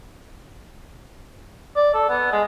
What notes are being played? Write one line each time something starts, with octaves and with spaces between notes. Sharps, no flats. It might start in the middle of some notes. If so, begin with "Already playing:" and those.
D5
A4
B3
G#3